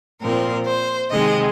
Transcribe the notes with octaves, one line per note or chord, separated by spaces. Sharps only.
A#2 F3 C4 A#4
C5
C3 D#3 G#3 C4 D#5